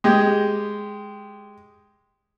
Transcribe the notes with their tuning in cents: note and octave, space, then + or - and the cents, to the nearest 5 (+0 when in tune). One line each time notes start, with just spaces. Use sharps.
G#3 +0 G4 +0